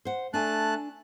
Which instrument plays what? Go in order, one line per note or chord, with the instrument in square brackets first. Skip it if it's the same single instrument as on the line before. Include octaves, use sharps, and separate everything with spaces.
[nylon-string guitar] C5 F#5
[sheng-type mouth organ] A3 A5 F#6 [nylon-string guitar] D4 G#5